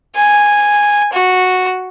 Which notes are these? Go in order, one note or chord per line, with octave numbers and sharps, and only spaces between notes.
G#5
F#4